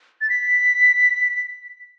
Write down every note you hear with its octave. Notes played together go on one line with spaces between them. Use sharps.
A6
B6